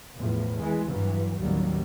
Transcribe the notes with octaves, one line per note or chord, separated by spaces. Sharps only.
E2 A2 F3
E3 G#3
G2 E3 F#3
A1 D#2 D#3 F#3 G3